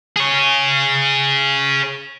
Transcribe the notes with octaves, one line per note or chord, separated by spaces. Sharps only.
G#4 C#5